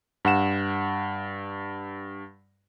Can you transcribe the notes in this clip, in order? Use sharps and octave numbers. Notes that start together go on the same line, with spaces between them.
G2 F#5 E7